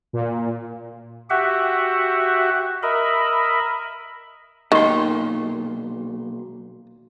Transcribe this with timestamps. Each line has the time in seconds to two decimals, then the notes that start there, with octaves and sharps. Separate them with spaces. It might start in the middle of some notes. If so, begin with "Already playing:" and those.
0.13 A#2
1.30 F#4 G4 E5 F#5
2.83 A#4 D#5 E5 B5
4.72 B1 A#2 D#3 C6